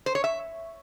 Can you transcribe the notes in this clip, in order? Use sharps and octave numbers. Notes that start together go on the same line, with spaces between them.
C5
C#5
E5